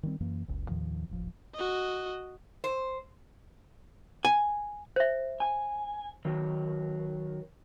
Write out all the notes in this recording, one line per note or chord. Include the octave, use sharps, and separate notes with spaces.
D#3 G3 C4
F#2 E3 A#3
F#1 C#2
D#2 A2 D#3 F3
D#1 A1 F3
F#4 D#5
C5
G#5
C5 E5
G#5
D#3 F#3